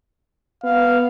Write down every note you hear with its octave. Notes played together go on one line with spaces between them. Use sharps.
B3 F5